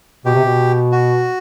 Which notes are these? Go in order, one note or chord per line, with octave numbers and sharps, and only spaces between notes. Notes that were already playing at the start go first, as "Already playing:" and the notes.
B2 G4
C3
B2
F#4